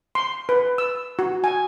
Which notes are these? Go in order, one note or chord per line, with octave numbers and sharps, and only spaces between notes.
C6
B4
E6
F#4
G#5